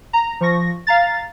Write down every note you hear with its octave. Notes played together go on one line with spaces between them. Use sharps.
A#5
F3 C#6 A#6
F5 A#5 A6